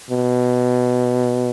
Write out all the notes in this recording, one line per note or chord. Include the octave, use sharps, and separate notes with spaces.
B2